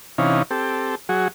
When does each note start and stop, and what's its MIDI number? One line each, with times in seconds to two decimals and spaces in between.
0.18 0.42 48
0.18 0.42 52
0.18 0.42 61
0.18 0.42 63
0.18 0.42 77
0.51 0.95 60
0.51 0.95 67
0.51 0.95 69
1.09 1.28 54
1.09 1.28 66
1.09 1.28 68